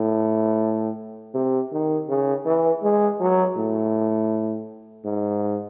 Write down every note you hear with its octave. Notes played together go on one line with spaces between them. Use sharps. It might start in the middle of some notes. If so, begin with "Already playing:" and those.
Already playing: A2
C3
D#3
C#3
E3
G#3
F#3
A2
G#2